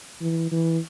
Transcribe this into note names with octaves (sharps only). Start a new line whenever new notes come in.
E3
E3